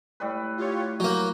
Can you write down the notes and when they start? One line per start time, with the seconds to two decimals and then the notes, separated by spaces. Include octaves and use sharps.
0.20 A2 G3 B4
0.57 F4 G4 C#5
1.00 F#3 A#3 G6